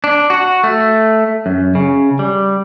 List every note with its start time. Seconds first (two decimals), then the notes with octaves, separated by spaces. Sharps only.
0.04 D4
0.30 F#4
0.64 A3
1.46 F#2
1.75 C#3
2.19 G3